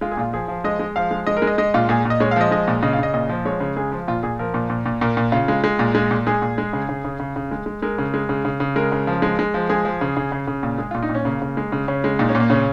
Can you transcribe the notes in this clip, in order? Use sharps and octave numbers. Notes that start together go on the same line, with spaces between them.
G#3 F4
G#4
A#2 F4
F3 G#4
F3
G#3 D#5
G#3
F3 F5
G#3
G#3 D#5
A#4
G#3
D#5
G#3 D#5
A#2 F4
A#2 G#4
A#2
D#5
G#3 C#5
F5
F3 D#5
G#3 D#5
A#2
C#3 D#5
F5
C#3 D#5
A#2 D#5
F3
G#3 C#5
C#3
G#3 G#4
F3 F4
A#2 F4
A#2 G#4
F3 A#4
A#2
A#2
A#2
A#2 A#4
A#2
C#3 F4
G#3
G#3
A#2
G#3
A#2
G#3 G#4
A#2
G#3
C#3
C#3
C#3
C#3
C#3
G#3
G#3
G#3 A#4
C#3
G#3
C#3
C#3
C#3
G#3 A#4
C#3
F3
G#3
G#3
F3
G#3 G#4
F3
C#3
C#3
C#3
C#3
A#2
G#3 G#4
A#2 F4
D#4
A#2
C#4
C#3 A#3
C#3
G#3
C#3
C#3 C#4
G#3
A#2 D#4
C#4
A#2
A#3
C#3 C#4